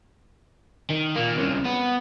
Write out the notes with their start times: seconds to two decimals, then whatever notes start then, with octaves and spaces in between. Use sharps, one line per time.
0.90 D#3
1.16 A#2 A#3
1.37 C2 C#3
1.66 B3